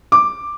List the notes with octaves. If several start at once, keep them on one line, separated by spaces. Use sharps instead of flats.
D6